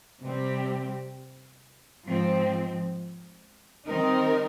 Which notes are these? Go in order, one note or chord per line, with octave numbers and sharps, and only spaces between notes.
C3 G3 C4 G4
G#2 F3 C4
D#3 G3 C4 D#4 A#4